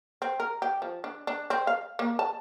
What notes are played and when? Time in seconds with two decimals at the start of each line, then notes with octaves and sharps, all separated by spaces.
0.22 C4
0.40 A#4
0.62 G4
0.82 F3
1.04 D4
1.27 D4
1.50 C4
1.67 F5
1.99 A#3
2.19 A5